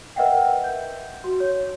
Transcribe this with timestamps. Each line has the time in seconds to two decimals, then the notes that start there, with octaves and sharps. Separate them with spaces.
0.16 A#4 B4 D#5 E5 F#5 G5
0.64 G6
1.24 F#4
1.40 C#5